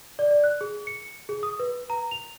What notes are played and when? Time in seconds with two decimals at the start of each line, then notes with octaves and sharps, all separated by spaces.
0.19 D5
0.31 D5
0.44 F#6
0.61 G#4
0.87 C#7
1.29 G#4
1.43 D#6
1.59 B4
1.90 A#5
2.11 F7